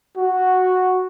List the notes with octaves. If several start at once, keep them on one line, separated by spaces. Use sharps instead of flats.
F#4